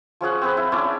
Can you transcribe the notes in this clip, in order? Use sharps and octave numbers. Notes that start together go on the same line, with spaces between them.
F3 C#4 G#4 F#5
C4 G#4 B4
E4
C#4 D4 E4 D5